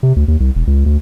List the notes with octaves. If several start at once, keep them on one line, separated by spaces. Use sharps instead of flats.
C3
D2
D#2
C2
E1
C#2
D2